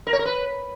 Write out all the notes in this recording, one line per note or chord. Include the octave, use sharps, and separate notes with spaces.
A#4
C#5
A#4
B4